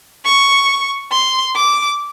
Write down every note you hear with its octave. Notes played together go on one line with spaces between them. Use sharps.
C#6
C6
D6